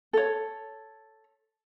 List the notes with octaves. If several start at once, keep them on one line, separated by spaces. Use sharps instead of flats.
A4 C#5